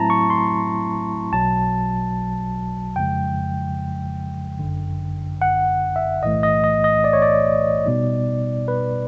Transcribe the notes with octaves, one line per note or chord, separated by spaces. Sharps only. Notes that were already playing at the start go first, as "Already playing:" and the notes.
Already playing: A2 F#3 A3 C4 E4 A5 A#5
C#6
C6
B1 B2 F#3 A5
F2 C#3 F3 G#3 G5
G1 F#2 D3
F#5
E5
B1 A2 E3 A3 D#5
D#5
D#5
D#5
D5
C#5
D5
B2 G3 B3 D#4
B4